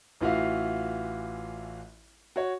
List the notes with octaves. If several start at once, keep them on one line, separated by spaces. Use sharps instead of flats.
A1 E3 F4 F#4 E5 F5
F#4 C#5